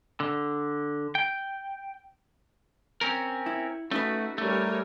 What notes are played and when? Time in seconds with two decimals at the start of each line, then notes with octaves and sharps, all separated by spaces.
0.20 D3
1.15 G5
3.01 C4 C#4 A#4
3.46 E4
3.91 A3 C#4 D#4 F#4 B4
4.38 G3 A3 A#4 C#5